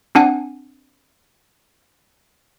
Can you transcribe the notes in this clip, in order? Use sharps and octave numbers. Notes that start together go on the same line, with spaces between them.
C4 D4 F#5 G#5